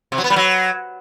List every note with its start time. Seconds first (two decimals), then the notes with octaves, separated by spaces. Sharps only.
0.12 C3
0.18 F#3
0.24 B3
0.30 G3
0.36 F#3